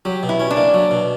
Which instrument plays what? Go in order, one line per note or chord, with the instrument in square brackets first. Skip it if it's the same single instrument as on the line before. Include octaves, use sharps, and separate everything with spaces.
[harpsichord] F#3 [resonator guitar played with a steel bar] G4
[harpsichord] B2
[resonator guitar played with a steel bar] E4
[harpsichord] C#4
[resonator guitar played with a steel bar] D4
[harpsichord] A#3
F#3
B2